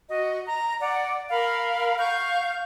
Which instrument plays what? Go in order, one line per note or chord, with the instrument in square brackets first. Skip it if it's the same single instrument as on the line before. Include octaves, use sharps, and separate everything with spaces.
[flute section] F#4 D#5
A#5
D5 F#5
A#4 F5 B5
F5 F#5 C#6 G6